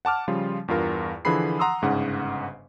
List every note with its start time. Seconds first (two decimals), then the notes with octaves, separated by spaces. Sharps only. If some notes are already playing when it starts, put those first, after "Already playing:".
0.05 F#5 A5 D6 F6
0.28 C#3 F3 G3 F4
0.68 E2 G2 F4 A#4
1.25 D3 E3 F3 G#4 B5 C7
1.59 F#5 A#5 C6 D#6 E6
1.82 G1 G#2 C#3 F#5